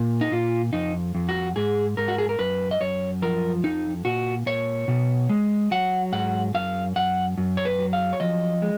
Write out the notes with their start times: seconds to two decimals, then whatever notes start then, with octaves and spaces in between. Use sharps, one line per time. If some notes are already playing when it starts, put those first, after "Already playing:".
Already playing: A#2
0.21 D#4
0.31 A#2 F4
0.73 F2 D#4
1.15 F2
1.29 F#4
1.56 G#2 G#4
1.97 G#2 A#4
2.08 F#4
2.18 G#4
2.29 A#4
2.39 F#2 B4
2.71 D#5
2.81 F#2 C#5
3.22 F3 A#4
3.64 F2 D#4
4.05 A#2 F#4
4.46 A#2 C#5
4.88 B2
5.29 G#3
5.71 F#3 F#5
6.12 G#2 F#5
6.54 F#2 F5
6.96 F#2 F#5
7.38 F#2
7.57 C#5
7.65 B4
7.79 F#3
7.93 F5
8.13 C#5
8.20 F3 D#5
8.62 G#3